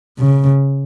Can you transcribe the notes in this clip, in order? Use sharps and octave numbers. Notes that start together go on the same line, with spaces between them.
C#3